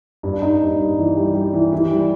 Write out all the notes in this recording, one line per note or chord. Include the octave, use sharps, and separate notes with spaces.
G2
D#4
G2
G2
E3
G3
G3
E3
E3
G3